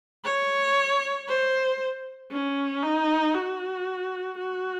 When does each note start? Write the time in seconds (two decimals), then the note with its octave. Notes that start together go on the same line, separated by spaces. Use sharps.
0.25 C#5
1.28 C5
2.32 C#4
2.83 D#4
3.34 F#4
4.38 F#4